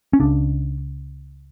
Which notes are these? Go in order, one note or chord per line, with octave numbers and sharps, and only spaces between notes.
C#4
C#2 C#3 D4